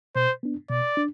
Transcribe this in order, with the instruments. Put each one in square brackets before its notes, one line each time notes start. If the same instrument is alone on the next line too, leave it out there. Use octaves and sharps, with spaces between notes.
[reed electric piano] B2 [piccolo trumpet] C5
[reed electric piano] B3 D4
[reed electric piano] B2 [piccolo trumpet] D5
[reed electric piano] D4